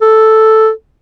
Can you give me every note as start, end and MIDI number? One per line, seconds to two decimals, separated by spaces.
0.02 0.70 69